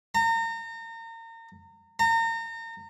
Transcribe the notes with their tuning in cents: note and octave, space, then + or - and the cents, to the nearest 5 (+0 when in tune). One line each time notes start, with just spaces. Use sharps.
A#5 -35
A#5 -35